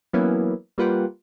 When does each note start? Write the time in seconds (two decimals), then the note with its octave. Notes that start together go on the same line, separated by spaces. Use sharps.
0.13 E3 F#3 A#3 B3 C#4 E4
0.78 G3 A#3 F4 B4 F#5 G5